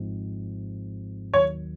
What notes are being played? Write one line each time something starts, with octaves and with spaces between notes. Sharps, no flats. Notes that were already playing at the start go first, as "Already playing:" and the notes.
Already playing: G#1 G#2 F3 G#3 C4
D#2 D#3 F#3 C#5